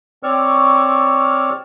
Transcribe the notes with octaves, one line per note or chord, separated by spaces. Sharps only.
C4 C#5 D5 C#6 E6 F6